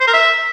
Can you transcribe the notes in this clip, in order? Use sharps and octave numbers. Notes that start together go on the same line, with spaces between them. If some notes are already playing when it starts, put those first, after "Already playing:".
C5
A#4
E5